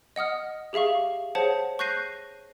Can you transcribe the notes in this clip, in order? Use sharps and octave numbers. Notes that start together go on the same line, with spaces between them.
D#5 F#5 D#6 F6
G4 G#4 E5 F5 C#6
G#4 C5 C#5 F#5 A5
C#6 F#6 G6 A#6 C7 D#7